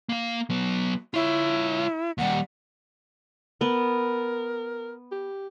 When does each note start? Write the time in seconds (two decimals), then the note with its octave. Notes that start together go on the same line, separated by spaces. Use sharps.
0.09 A#3 F5
0.50 F#3 B3
1.14 E4 F4 C#5
2.18 D#2 G3 F#5
3.61 B3 A#4
5.12 G4